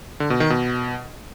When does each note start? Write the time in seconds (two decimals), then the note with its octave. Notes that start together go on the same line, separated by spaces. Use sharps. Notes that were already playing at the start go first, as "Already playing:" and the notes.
0.20 D3
0.30 B2
0.40 D#3
0.50 B2